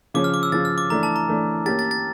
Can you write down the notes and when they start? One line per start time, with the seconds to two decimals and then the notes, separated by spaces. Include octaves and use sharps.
0.14 C#3 F3 C#4 D6
0.24 F6
0.34 D6
0.43 E6
0.52 C#3 F3 C#4 A6
0.65 F6
0.78 D6
0.90 E3 A3 D4 A#5
1.03 A5
1.16 A#5
1.28 E3 A3 D4
1.66 A#3 C#4 G4 A6
1.79 A6
1.91 A6